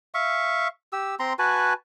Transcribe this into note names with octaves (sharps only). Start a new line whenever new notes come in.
E5 F5 C#6
G4 E6
C4 A#5 C6
F#4 B4 G#5 A5